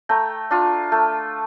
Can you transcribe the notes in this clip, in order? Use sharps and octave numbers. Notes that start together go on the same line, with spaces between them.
A3 G5 A#5
D4 F4
A3